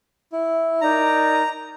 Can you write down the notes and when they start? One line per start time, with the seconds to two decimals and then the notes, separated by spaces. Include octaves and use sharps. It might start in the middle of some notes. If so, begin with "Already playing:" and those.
0.32 E4
0.81 D#4 A#4 D5 A#5